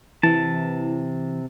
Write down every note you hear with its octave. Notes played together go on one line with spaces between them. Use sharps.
C3 E3 A5